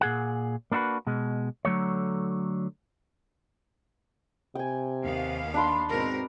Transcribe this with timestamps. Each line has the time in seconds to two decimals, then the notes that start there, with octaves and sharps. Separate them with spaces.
0.01 A#2 G#4 F#5
0.72 A#3 D4 E4 F#4 B4
1.07 B2 G#3
1.65 D3 F#3 A3 C#5
4.55 C3 G5 G#5
5.02 D#2 B3 F5
5.54 D4 B5 C6
5.90 G#2 B2 C4 A#4